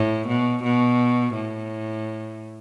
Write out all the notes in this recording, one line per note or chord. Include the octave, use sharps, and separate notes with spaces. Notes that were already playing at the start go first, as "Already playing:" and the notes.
Already playing: A2
B2
B2
A2